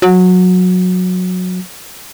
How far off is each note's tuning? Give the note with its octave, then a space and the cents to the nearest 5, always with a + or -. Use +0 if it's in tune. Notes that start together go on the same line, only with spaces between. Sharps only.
F#3 -20